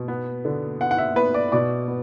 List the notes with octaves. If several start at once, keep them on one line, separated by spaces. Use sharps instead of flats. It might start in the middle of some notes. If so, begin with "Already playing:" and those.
Already playing: B2
B3
D3
B3 F#5
F#5
E5
B3 B4
D5
B2 D5
B3